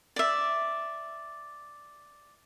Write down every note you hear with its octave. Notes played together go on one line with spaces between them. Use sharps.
D5 E5